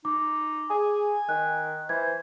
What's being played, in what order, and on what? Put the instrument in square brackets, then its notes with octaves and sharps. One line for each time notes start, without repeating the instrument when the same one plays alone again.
[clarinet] D#4 [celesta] D6
[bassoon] G#4 [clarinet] G#5
[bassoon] D#3 [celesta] F#6
[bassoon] E3 [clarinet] C5 [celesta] G#6